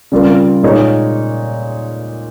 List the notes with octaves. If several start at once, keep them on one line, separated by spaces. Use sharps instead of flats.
C#3 G3 C4 F4 A#4
A#2 G#3 D#4 A#4 C#5